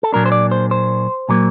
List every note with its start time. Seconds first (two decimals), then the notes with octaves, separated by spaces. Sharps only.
0.03 A4
0.12 A#2 F#3 A#3 D4 A#4
0.26 C5
0.32 D5
0.51 C5
0.71 C5
1.29 A#2 F#3 A#3